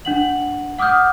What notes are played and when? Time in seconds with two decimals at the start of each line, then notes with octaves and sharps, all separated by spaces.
0.05 D4 F#5 F#7
0.79 F#5 D6 D#6 F6 G6